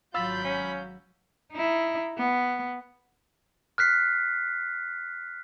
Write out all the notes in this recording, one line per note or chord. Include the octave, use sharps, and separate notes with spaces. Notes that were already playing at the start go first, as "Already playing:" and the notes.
G#1 F#3 F4 F5 B5 E6 G6 A6
C#4
D#4 E4
B3
F6 F#6 B6 C7